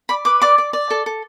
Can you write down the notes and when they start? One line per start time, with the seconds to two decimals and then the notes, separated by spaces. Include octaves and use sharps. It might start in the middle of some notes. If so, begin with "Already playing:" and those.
0.09 D5 B5
0.25 B4 D6
0.42 D5 D6
0.58 D5
0.73 D5
0.91 A4
1.06 A4